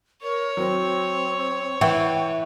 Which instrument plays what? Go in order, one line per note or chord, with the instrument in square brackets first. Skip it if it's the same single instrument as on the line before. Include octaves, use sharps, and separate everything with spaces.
[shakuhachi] A#4 [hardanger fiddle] C#5
[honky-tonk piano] F#3 [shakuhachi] C4
[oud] E3 [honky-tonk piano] F#5 G5 C#6